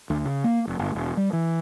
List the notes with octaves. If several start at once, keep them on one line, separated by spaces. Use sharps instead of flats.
D2
C#3
A#3
F1
G1
E1
G3
E3